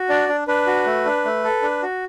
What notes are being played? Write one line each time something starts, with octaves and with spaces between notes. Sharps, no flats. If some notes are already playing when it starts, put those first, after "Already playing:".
Already playing: F#4
D4 D5
D4
D4 B4
F#4
A3
D4
A3
A4
D4
F#4